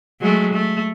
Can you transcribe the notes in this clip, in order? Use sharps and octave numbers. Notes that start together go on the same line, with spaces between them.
F#3 G#3 A3
A3